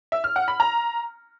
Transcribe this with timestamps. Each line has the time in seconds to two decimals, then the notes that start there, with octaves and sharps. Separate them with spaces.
0.12 E5
0.24 F6
0.36 F#5
0.48 B5
0.60 A#5